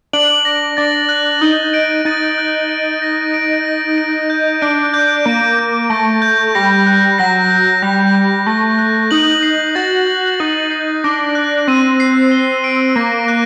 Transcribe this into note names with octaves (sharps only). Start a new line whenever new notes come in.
D4 F#7
A#6
D4 A6
F#6
D#4 G7
D7
D#4 A6
F#6
D7
A#6
D7
A#6
D7
G6
D4 D7
G6
A#3 D7
G6
A3 A#6
G6
G3 A#6
F#6
F#3 A#6
G6
G3 A#6
G6
A3 A#6
F#6
D#4 F#7
C7
F#4 A6
F#6
D#4 F#7
C7
D4 A#6
F#6
C4 D#7
C7
G7
D7
A#3 A#6
F#6